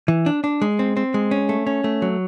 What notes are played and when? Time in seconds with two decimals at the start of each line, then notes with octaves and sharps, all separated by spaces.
0.08 E3
0.26 D4
0.44 D4
0.62 G#3
0.79 C4
0.97 C4
1.14 G#3
1.31 C#4
1.49 A3
1.67 C#4
1.84 A3
2.02 F#3